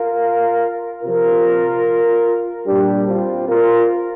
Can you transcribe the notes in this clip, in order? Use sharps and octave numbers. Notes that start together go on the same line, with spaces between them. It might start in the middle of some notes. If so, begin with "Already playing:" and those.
Already playing: F4 A#4
C3 F3 F4 A#4
A#2 G3 D4 G4
C4 F4
F4 A#4